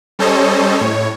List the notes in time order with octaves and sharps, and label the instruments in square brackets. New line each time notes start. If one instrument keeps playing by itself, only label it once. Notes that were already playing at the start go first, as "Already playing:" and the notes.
[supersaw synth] G3 C#4 A4 C5 C#5 D#5
A2 C#5